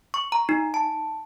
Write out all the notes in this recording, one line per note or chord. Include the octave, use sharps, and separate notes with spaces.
C#6
A#5
D#4
A5